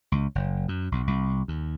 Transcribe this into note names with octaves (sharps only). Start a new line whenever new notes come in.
C#2
F#1
F#2
B1
C2
D#2